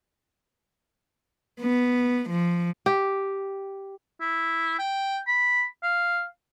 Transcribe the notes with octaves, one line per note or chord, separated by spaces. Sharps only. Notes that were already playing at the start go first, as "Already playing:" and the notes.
B3
F3
G4
E4
G5
B5
F5